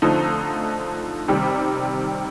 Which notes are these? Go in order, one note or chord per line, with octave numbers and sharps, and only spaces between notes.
D3 F3 A3 C4 D#4
C3 D#3 G3